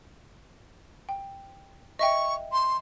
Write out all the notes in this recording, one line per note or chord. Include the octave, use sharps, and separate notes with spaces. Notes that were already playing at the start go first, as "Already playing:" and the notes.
G5
D#5 E5 G5 C#6
C6